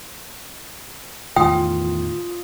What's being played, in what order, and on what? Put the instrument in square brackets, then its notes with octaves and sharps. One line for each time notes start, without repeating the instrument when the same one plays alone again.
[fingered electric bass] E2 A2 D#3 [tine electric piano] F4 [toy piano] G5 [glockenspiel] D#6